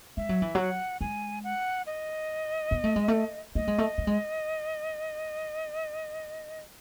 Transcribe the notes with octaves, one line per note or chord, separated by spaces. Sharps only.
G#3 E5
F#3
E3
F#3 F#5
G#3 G#5
F#5
D#5
B3
A3
G#3
A3
A3 D#5
G#3
A3
A3
G#3